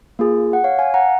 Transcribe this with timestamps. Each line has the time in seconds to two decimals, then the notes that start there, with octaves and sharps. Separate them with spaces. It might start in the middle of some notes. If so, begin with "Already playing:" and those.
0.19 A#3 F4 G#4
0.53 F#5
0.64 C#5 F5
0.79 F5 G#5
0.94 F#5 A#5